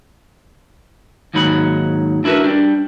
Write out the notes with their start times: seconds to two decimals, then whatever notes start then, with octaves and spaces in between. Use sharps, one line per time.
1.34 D#2 G#2 D#3 F#3 B5
2.24 D4 E4 F#4 A#4 B4
2.44 G3 D4